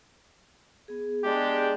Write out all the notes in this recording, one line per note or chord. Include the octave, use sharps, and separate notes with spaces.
B3 G#4
G#3 D4 G4